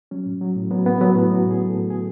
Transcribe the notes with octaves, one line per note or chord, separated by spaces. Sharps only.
F#3 C#4
A2
F#3
A2
F#3 B3
A2 B3
F#3 B3
A2 A3
F#3 F#4
A2
G#4
F#3
A2 A4
F#3 G#4